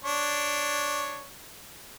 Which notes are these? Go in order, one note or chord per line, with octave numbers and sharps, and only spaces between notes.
D4 C#5